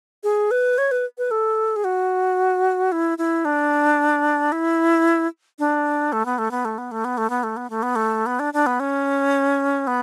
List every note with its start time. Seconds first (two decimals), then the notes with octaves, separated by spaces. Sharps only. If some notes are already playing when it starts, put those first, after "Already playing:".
0.24 G#4
0.51 B4
0.78 C#5
0.91 B4
1.18 B4
1.31 A4
1.76 G#4
1.84 F#4
2.92 E4
3.18 E4
3.45 D4
4.52 E4
5.59 D4
6.13 A3
6.25 B3
6.38 A3
6.51 B3
6.65 A3
6.78 B3
6.91 A3
7.05 B3
7.18 A3
7.30 B3
7.43 A3
7.57 B3
7.70 A3
7.83 B3
7.96 A3
8.26 B3
8.39 D4
8.54 D4
8.66 B3
8.80 C#4
9.87 B3